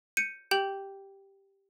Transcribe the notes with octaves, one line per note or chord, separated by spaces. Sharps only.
G6 C#7 D#7
G4 G5 G6 F#7